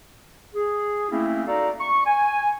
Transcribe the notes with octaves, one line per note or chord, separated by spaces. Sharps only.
G#4
A3 A#3 C4 C#4 E4
D#4 F#4 A4 D5 F5 A#5
C#6
G#5